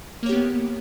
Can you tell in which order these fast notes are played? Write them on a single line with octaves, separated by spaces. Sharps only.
A#3 C#5 G4 B3